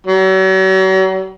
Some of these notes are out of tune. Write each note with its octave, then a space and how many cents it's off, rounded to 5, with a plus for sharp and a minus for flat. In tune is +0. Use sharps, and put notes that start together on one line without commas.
F#3 +40